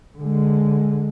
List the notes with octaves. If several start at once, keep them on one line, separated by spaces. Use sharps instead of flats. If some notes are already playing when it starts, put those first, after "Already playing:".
D3 G#3